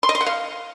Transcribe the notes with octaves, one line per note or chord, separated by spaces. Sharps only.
C6
D#5
C6
F#5
F5